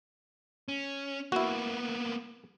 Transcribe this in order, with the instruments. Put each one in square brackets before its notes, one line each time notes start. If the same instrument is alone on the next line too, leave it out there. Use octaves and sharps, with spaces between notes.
[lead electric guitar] C#4
[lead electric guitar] A#3 B3 [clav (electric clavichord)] E4 F#4